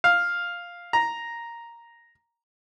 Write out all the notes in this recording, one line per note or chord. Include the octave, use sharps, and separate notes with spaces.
F5
A#5